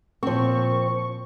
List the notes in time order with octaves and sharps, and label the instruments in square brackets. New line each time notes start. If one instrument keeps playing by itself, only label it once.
[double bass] A#2 [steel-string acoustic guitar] F3 C4 [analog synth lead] C#6